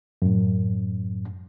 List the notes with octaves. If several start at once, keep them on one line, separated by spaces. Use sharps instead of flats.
F#2 A2